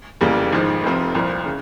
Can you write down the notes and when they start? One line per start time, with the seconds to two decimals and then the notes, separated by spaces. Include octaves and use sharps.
0.21 F1 E2 C#3 G3 A#3
0.53 G#1 G#2 F3
0.84 F1 F2 C3 F3 C4
1.15 C2 A#2 F3
1.46 C#3